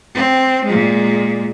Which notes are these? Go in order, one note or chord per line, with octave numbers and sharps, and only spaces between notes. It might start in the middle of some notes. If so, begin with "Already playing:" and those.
C4
A#2 G#3